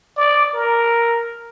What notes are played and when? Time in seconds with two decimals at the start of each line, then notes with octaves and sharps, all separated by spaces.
0.17 D5
0.53 A#4